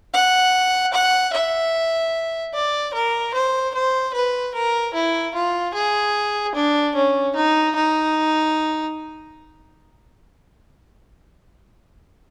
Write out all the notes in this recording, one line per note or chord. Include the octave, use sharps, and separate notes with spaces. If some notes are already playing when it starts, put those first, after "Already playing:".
F#5
F#5
E5
D5
A#4
C5
C5
B4
A#4
E4
F4
G#4
D4
C#4
D#4
D#4